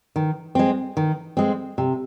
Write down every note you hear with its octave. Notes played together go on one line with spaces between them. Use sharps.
D#3
G#3 C4
D#3
G#3 C4
C3